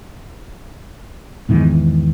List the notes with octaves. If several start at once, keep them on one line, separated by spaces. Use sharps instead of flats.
E2 G#2 D#3 E3